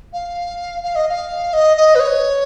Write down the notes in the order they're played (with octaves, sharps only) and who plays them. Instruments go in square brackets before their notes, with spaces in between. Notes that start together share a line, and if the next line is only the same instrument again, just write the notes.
[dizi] F5
F5
D#5
F5
D#5
D#5
B4
C#5